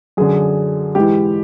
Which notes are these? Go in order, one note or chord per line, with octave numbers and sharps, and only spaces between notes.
F#2 D3 G#4
G#2 E3 G4